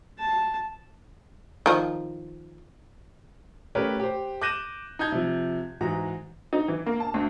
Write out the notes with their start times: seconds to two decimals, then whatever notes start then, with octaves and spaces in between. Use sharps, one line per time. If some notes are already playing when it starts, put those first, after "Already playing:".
0.19 A5
1.66 D#3 F3
3.75 A3 C#4 G4 A#4 B4 C#5
4.00 G4 C5
4.42 D6 F#6 G6 A#6 D#7 E7
4.99 D#4 A5 G6 G#6
5.12 C3 F3
5.81 G#2 E3 F#4 A#5
6.53 D#4
6.68 E3
6.86 A#3
7.00 A5
7.14 D2